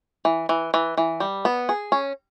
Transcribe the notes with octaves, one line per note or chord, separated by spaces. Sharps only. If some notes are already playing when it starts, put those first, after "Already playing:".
E3
E3
E3
E3
G3
B3
G#4
C#4